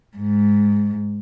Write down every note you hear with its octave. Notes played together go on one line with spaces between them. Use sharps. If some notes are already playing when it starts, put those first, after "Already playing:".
G#2